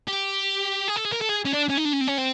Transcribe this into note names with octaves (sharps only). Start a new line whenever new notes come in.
G4
G#4
A4
G#4
A#4
A4
G#4
C#4
D4
C#4
D#4
D4
C#4
C4
C#4
C4